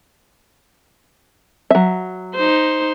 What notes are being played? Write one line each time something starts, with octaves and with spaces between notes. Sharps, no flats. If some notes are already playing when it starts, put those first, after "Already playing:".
F#3 E5
D#4 C5